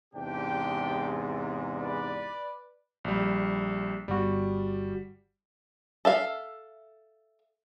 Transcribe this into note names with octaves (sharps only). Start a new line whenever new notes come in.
E2 G#2 C3 D4 G4 G5
B4 D5
A#1 G3
G1 G3 F#4 D5
A4 E5 F5